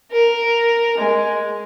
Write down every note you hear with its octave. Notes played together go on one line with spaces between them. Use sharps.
A#4
G#3